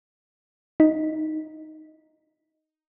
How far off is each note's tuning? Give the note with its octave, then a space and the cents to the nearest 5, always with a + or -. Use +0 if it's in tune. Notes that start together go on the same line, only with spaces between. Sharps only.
D#4 +5